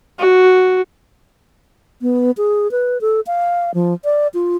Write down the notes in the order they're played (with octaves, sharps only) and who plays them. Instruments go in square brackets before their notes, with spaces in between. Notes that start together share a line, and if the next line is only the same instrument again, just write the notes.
[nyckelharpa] F#4
[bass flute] B3
G#4
B4
A4
F5
F3
D5
F4